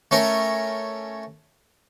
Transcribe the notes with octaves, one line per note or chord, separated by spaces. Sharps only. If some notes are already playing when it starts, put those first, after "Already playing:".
A3 C#4 A#4